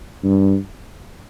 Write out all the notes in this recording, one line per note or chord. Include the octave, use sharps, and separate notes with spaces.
G2